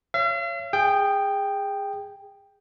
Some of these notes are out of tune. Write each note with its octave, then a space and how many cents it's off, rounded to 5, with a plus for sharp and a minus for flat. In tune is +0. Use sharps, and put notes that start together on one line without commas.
C#5 +0 F5 -45
G#4 -20 G5 +5